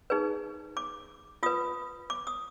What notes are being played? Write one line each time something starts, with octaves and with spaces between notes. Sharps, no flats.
D#4 G#4 B4
D6
F4 B4 D#6
D6
D#6